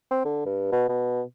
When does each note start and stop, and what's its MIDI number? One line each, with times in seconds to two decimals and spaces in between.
0.11 0.20 60
0.25 0.41 50
0.46 0.71 43
0.72 0.84 47
0.89 1.22 47